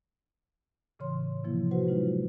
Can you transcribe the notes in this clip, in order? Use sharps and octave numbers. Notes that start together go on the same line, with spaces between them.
A2 C#3 E3 C#5 C6
C3 E3 F3 A#3 E4
F#4 B4 C5 F#5
F#3 G#3 D#4 F4